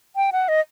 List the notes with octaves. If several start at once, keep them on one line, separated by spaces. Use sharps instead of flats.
G5
F#5
D#5